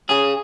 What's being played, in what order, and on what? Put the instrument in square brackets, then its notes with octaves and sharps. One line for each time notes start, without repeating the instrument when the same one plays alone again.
[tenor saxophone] C#3 [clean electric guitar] G#4